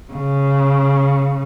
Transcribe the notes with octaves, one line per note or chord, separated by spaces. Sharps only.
C#3